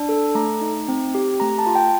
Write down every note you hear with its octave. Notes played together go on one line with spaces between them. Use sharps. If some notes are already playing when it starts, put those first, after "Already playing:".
Already playing: D4
A4
A3 A#5
D#4
C4
G4
A3 A#5
A5
F4
G5